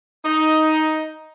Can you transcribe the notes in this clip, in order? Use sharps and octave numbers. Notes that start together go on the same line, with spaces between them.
D#4